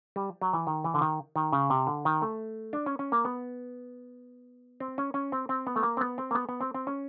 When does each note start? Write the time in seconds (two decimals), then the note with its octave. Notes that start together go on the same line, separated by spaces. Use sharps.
0.16 G3
0.42 F#3
0.53 E3
0.67 D#3
0.84 E3
0.94 D3
1.01 D#3
1.36 D#3
1.53 C#3
1.70 C3
1.87 D3
2.05 D#3
2.22 A3
2.73 D4
2.86 C#4
2.99 C#4
3.12 A#3
3.25 B3
4.80 C4
4.98 C#4
5.14 C#4
5.32 C4
5.49 C4
5.67 B3
5.76 A3
5.83 A#3
5.97 C4
6.01 B3
6.18 C4
6.31 A#3
6.35 B3
6.49 B3
6.61 C4
6.74 C4
6.87 C#4